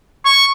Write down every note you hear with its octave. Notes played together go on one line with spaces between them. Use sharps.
C#6